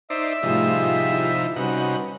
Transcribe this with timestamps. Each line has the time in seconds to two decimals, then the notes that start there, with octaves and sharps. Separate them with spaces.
0.10 D#4 C5 D5 E5 E6
0.43 A2 C3 F3 G3 A3 D#4 F4 G#4
1.07 E4
1.56 C3 G3 C#4 D#4 F#4 B4 F#5